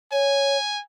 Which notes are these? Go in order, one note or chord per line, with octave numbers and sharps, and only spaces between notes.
C#5 G#5